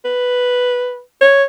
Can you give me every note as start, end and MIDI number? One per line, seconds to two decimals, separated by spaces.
0.05 1.01 71
1.21 1.44 73